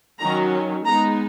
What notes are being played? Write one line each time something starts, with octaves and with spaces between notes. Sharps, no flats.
D#3 F#3 C#4 A#5
G#3 B3 D#4 A#5